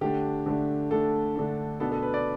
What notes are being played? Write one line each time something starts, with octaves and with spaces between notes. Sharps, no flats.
D3 A3 D4 G4
D3 A3 D4
D3 A3 D4 A4
D3 A3 D4
B2 B3 D4 A4
A4
B4
D5